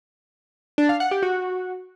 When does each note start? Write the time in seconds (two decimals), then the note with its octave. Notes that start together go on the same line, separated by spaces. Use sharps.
0.78 D4
0.89 F5
1.00 F#5
1.11 G4
1.23 F#4